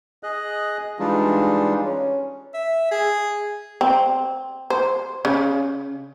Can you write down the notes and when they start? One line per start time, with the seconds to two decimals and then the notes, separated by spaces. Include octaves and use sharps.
0.23 G#4 D#5 F#6
0.99 E3 G3 G#3 D4 D#4 F4
1.86 C#4
2.54 E5
2.91 G#4
3.81 C4
4.70 C5
5.25 C#3